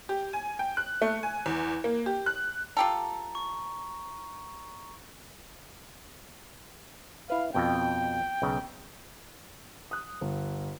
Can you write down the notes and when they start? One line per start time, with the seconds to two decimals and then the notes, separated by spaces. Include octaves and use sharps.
0.09 G4
0.33 G#5
0.59 G5
0.77 F#6
1.02 A3
1.23 G#5
1.46 E2
1.84 A#3
2.06 G4
2.26 F#6
2.77 F4 G4 A4 A#5
3.35 C#6
7.30 E4 B4 F5
7.55 F2 B2 G5
8.42 B1 C#3
9.91 D#6 F#6
10.21 G1